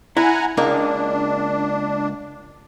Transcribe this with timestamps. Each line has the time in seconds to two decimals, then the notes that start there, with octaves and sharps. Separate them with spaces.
0.17 E4 F#5 G#5 A#5
0.57 C#2 A#3 D4 D#4